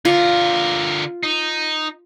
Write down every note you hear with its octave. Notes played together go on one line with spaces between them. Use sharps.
D3 F4 A#4
D#4